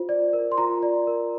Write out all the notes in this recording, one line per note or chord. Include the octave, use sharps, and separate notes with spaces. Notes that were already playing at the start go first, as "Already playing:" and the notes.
Already playing: F4 C5
D5
A#4
C6
F4 A#5
D5
A#4